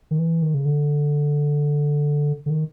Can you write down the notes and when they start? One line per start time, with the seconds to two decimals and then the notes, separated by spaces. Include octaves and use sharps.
0.11 D#3
0.19 E3
0.42 D#3
0.54 C#3
0.65 D3
2.46 D3
2.50 D#3